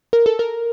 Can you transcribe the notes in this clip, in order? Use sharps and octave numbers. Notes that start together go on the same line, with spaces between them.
A#4
A4
A#4